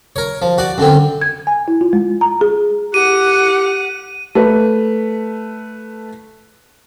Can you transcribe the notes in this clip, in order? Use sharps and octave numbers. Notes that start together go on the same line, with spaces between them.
A#4 C#5
F3
F#4 D5
F#2 D3 C4
G#6
G#5
E4
F4
G#3
A#5
G#4
G4 F#5 D#7
A3 B4